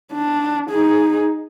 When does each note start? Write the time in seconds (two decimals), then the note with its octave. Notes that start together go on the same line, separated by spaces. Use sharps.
0.13 D4
0.70 D#4 G#4